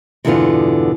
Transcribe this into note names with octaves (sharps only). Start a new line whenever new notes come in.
E2 G2 B2 D3 B3 F4